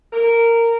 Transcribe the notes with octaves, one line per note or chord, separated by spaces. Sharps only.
A#4